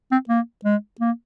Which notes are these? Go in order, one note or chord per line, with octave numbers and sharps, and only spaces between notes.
C4
A#3
G#3
A#3